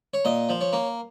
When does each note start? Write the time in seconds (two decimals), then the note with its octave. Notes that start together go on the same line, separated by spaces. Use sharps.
0.14 C#5
0.25 A#2 D#5
0.49 F3
0.61 C#5
0.73 A#3